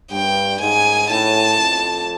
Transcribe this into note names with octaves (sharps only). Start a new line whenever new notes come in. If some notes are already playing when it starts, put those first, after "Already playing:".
G2 G5
G#2 G#5
A2 A5
F2